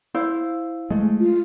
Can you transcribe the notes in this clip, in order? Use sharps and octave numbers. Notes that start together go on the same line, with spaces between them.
E4 C5 F5
G#3 A3
F4